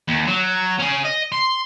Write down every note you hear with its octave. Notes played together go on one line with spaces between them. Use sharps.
D#2
F#3
C#4 G#4
D#5
C6